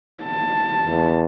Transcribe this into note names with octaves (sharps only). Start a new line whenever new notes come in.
A5
E2